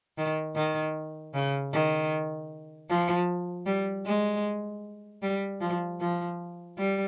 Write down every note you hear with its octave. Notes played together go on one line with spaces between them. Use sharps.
D#3
D#3
C#3
D#3
F3
G3
G#3
G3
F3
F3
G3